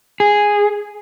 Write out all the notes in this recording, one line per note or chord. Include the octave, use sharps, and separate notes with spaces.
G#4